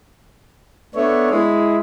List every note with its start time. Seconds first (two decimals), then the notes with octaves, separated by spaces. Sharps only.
0.95 A3 B3 D4 C#5
1.31 G#3 E4